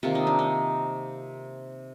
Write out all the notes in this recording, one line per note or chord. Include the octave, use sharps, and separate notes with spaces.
C3 D#3 A#3 F4
D#4
D4
D#4